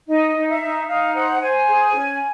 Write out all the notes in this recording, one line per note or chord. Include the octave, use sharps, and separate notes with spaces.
D#4 D#5
D#4
E5
D#4
D#4 F5
C5 F#5
C5 G#5
G#4
C#4